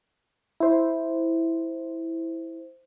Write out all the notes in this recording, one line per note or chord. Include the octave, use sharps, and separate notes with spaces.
E4 C5